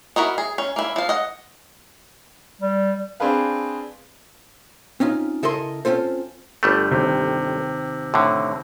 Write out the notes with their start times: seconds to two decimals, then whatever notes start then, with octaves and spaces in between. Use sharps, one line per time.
0.16 E4 F#4 A#4 D#5
0.38 G#4
0.58 C#4
0.76 A#3 E4
0.96 F3 F5
1.09 D#5 F#5
2.61 G3
3.20 C4 D4 G#4 B4 F5
5.00 C4 C#4 D#4 F4
5.43 C#3 E4 A4 A#4 D#5 C6
5.85 C4 C#4 F4 A4 C5
6.63 G1 G3 A3
6.91 D#2 C3
8.14 A2 D3